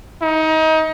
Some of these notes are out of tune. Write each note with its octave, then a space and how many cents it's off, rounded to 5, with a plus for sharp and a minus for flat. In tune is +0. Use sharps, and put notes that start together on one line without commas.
D#4 +25